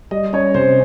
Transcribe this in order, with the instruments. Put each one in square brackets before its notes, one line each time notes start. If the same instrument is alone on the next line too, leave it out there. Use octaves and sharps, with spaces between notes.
[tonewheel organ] G3 [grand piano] D#5
[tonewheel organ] C#4 [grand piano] C#5
[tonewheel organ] C3 [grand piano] C5